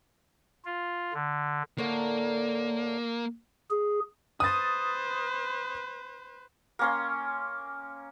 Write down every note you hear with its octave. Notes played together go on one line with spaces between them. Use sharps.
F4
D3
A2 D3 A#3
G#4
B4 C5 D#6 A6
A#3 C#4 C6